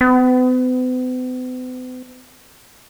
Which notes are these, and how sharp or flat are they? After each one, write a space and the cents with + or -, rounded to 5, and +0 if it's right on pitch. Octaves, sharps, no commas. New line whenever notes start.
B3 +45